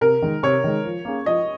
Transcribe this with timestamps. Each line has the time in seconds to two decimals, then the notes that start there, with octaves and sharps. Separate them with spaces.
0.01 C3 A#4
0.22 D#3 G#3
0.43 C3 C#5
0.64 D#3 G#3
0.85 F3
1.05 A#3 C#4 G#4
1.26 F3 D#5